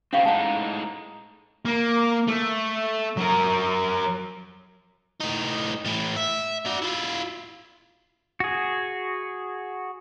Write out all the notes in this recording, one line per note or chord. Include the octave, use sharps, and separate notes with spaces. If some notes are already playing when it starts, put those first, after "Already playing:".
C#3 C4 C#4 F5 C#6
A2 G#3 D#4 F#5 A5
A#3
A3
F#3 A#4
A2 D#4
A2 E3
E5
F#4 D5
E4 F4
F#4 G#4